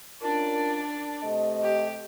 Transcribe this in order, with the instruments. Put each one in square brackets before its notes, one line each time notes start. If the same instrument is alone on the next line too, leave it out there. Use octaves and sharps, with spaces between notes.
[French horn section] C#4 F4 A#4 [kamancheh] D4 D5
[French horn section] C3 A3 D#5
[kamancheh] G4